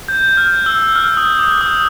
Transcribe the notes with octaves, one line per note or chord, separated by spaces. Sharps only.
G6
F6
E6
F6
D#6
D6
D#6